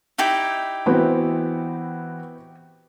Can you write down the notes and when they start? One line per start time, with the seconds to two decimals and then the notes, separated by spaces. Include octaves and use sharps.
0.18 D#4 E4 G4
0.86 E3 B3 C4 F#4